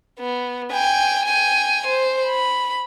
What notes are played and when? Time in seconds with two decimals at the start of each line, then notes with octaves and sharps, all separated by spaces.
0.19 B3
0.73 G5 G#5
1.25 G5 G#5
1.87 C5
2.25 B5